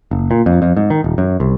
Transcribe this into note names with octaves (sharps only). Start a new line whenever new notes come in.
F#1
A#2
F2
F2
G#2
D#3
D#1
F#2
C2